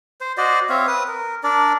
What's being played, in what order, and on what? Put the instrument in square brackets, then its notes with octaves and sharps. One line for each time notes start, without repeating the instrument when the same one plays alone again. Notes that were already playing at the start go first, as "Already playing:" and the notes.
[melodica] C5
F#4 C5 D5 D#5
C4 C#5 E5 F5
B4 D#6
A#4
D4 A#4 D5